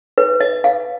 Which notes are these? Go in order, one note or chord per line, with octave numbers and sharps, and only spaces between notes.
B4
D#5
F5